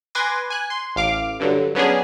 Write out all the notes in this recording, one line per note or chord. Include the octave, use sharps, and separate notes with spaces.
B4 G#5 C6 D6 G#6 A#6
G#5 F#6
C6
A1 F5 D6
G2 D3 F#3
F#3 B3 C#4 D4 G#4